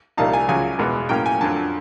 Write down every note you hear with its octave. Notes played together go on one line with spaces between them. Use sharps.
C2 A#2 G3 A#3 D#4 A5
G#5
C#2 C#3 F#3 G#5
E2 B2 G#3 B3
A2 F#3 A#3 C#4 G5
G#5
F2 D3 F#3 A5